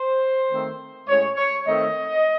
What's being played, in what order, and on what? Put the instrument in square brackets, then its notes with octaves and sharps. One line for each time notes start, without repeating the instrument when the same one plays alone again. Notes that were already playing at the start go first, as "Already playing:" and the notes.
Already playing: [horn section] C5
D#3 A3 C4
A2 G#3 C#4 C#5
C#5
D#3 A3 C4 D#5